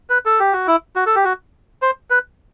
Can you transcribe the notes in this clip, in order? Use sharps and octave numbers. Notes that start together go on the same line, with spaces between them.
B4
A4
G4
F#4
E4
F#4
A4
G4
F#4
C5
B4